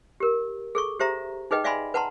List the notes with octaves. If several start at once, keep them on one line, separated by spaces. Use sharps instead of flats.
G4 A#4
G#4 A4 C#6
G4 C5 E5 A#5
D#4 G#4 B4 D#5 G5
D5 E5 F5 G#5 B5 C6
B4 F#5 A5 A#5 C6